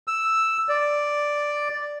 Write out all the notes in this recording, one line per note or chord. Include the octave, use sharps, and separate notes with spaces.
E6
D5